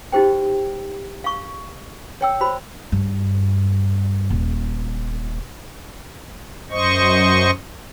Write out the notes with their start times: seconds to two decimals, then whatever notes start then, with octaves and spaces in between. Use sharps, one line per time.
0.12 D#4 F#4 G4 C5 G5
1.24 F5 C#6
2.21 C#5 G5 E6
2.41 F#4 C5 B5
2.92 G2
4.30 D#1
6.71 F#2 C5 D#5 C#6